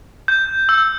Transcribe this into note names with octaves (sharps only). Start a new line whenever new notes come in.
G6
E6